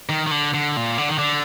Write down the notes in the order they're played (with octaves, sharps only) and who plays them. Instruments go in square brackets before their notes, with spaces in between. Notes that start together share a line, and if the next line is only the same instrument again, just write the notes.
[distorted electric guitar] D#3
D#3
D3
D3
A#2
D3
D#3
D3